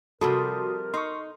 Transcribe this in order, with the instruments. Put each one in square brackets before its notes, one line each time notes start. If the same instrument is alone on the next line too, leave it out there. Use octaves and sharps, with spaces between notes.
[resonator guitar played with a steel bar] C3 F3 G3 [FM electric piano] F#4 C6 D#6 [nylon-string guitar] A4 [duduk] A#4
[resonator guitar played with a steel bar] D#4 [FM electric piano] C6 C#6